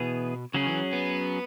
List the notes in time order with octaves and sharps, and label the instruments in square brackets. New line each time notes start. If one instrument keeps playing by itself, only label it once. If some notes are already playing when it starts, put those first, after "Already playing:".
Already playing: [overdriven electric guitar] B2 [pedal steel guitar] E3 B3 G#4
[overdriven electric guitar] C#3 [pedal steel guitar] F#3 C#4 G#4
[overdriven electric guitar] E3
B3